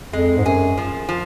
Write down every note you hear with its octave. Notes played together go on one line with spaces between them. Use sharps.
F2 G#3
G#2
F#2 G#4
F3
F3